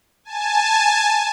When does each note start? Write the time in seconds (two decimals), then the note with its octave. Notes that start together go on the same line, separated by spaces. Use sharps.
0.25 G#5 A5